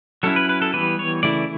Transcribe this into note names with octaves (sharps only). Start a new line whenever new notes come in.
F#3 C#4 E4 A4
B4
B4
A4
E3 G3 B3 B4
C#5
C#3 E3 A3 E4 D5